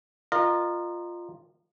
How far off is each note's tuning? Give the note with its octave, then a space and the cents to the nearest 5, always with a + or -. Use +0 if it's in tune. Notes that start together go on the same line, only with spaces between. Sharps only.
F4 +0 A#4 +0 D#5 -35